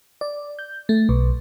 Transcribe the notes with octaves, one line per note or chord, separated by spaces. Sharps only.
D5
G6
A3
B1